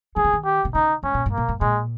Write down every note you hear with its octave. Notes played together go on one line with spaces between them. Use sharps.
D#3 G#4
C#3
D#3
G4
C3
C#3 D#4
G#2 C#4
A#2
G#2
A#3
A#2
G#2
A#2 G#3